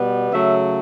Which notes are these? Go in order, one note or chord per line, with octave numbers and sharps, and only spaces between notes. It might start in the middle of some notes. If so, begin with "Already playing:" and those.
Already playing: B2 G3 B3
C#3 F#3 A3 E5